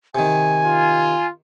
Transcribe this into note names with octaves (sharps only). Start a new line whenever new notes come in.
C3 D#3 G#5
F4